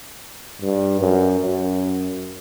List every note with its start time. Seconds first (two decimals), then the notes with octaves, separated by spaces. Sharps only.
0.62 G2
1.00 F#2
1.40 F#2